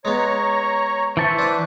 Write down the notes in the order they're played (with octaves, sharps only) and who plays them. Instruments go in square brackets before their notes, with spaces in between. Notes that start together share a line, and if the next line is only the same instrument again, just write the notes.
[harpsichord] G#3 B3 [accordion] C#5 A#5 C#6
[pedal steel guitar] E3 A5 C#6 [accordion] C5 E5
[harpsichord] D4 F#5